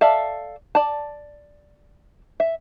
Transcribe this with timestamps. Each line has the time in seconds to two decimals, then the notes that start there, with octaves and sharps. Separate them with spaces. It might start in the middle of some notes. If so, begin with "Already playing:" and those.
0.01 A4 D5 E5 F5 A5
0.75 D5 A5
2.40 E5